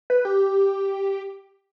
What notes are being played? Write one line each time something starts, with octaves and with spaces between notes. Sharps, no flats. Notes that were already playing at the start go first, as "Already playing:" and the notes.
B4
G4